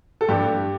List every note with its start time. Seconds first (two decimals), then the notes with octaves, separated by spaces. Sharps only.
0.21 A4
0.29 G2 G4
0.44 G2